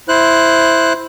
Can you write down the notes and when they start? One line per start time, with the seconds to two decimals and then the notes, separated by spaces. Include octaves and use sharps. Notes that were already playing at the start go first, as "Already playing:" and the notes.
0.09 E4 C5 F#6